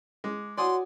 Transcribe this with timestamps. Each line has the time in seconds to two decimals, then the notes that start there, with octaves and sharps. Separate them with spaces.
0.24 G#3 D6
0.58 F#4 C#5 D5 F#5 G#5 C6 D#6